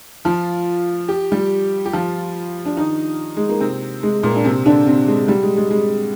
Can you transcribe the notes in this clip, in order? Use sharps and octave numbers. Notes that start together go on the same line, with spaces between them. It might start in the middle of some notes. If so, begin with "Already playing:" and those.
F3 F4
G4
G3 G4
G4
F3 F4
D4
D#3 D#4
G#3
A#3
C3 C4
G#3
A#2 A#3
D4
C3 C4
D3 D4
C3 C4
G#3
G3
G#3
G#3
G#3